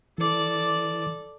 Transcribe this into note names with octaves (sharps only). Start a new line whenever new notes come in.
E3 A4 D5